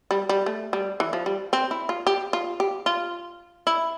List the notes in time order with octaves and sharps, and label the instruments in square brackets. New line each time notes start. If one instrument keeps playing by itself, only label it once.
[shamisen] G3
G3
A3
G3
E3
F3
G3
C4
E4
F4
G4
F4
G4
F4
E4